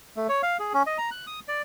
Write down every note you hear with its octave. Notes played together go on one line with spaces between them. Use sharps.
A3
C#5
F5
G#4
C#4
D#5
A#5
F#6
D#6
D5